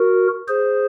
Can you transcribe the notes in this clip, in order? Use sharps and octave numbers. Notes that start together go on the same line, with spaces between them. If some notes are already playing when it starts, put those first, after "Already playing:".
Already playing: F#4 A#4
G#4 C5